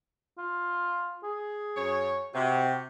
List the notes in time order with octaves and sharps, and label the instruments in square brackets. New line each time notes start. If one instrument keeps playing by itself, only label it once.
[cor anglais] F4
G#4
[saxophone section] F#2 C#5
[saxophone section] C3 [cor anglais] F#4